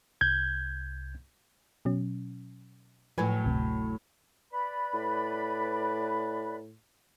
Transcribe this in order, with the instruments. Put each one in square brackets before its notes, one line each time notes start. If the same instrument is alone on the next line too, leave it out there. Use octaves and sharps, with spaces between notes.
[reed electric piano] C2 G6 G#6
[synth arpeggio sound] B2 F#3 C#4
[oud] A2 F#3 [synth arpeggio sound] F3 B4 G#5
[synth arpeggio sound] G1 D2 C3
[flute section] B4 D5 B5
[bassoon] A2